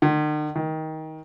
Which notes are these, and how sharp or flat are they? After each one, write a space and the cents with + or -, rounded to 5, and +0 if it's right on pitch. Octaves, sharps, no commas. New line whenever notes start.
D#3 -45
D#3 +20